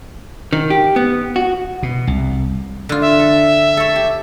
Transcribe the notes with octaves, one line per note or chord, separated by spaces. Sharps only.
D#3
G4
B3
F#4
B2
C2
D3 F4
E5
A4
A4 C#5
G4